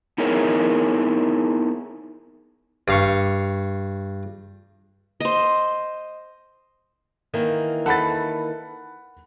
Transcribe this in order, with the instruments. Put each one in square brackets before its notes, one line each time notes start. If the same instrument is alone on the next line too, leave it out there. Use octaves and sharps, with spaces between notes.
[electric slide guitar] B3 D#4 E4 G#4 A#4 C#5
[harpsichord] G2 F5 C#6
[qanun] C5 D#5
[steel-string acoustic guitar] D#3 E3 A#3
[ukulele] A4 B4 [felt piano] F#5 B5 A6